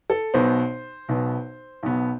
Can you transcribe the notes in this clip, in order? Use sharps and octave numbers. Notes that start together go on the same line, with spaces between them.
A4
B1 B2 B3 C5
B1 B2 B3
B1 B2 B3